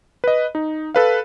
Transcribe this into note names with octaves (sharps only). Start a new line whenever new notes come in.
B4 D#5
D#4
A4 B4 F5